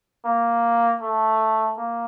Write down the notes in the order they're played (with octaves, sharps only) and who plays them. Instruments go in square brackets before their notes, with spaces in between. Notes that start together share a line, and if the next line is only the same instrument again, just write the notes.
[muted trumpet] A#3
A3
A#3